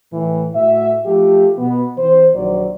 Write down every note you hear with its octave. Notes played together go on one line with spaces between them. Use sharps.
A2 E3
A2 F#4 E5
F3 A3 F4 G4
B2 B3
E3 C4 C5
A#1 D#3 F#3 C5 D5